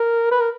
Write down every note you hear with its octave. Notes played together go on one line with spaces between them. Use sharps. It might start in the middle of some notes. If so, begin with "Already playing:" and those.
Already playing: A#4
B4
A#4